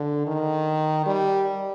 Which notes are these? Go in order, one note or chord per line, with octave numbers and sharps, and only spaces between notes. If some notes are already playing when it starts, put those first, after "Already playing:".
Already playing: D3
D#3
G3